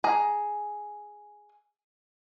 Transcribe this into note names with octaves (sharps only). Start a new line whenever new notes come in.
G#4 A#5